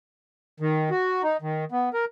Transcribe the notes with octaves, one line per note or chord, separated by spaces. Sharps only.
D#3
F#4
D#4
D#3
B3
A#4